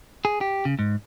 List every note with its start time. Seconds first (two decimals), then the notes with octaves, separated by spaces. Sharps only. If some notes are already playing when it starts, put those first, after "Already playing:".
0.25 G#4
0.41 G4
0.65 C#3
0.79 G#2